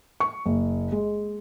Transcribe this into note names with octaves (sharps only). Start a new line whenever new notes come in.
C#6
F#1
G#3